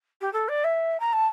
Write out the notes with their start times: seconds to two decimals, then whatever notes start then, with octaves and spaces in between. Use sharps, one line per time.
0.21 G4
0.33 A4
0.48 D5
0.64 E5
1.00 A#5
1.13 A5